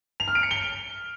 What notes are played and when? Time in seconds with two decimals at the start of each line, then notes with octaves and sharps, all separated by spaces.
0.20 F7
0.28 F6
0.35 D7
0.43 C#7
0.51 G7